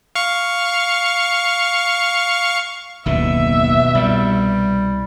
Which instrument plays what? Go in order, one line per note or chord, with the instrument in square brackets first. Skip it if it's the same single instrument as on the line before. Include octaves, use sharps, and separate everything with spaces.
[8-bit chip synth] F5 C#6
[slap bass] F#1 D#2 D3 [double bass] B2 [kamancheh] E5
[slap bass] C2 C3 [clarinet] G3